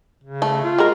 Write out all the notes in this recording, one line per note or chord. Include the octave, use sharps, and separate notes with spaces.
C#3
A3
F4
G#3 F#4 A#4